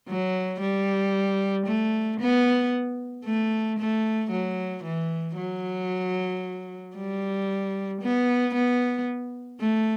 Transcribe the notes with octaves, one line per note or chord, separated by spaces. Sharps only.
F#3
G3
A3
B3
A3
A3
F#3
E3
F#3
G3
B3
B3
A3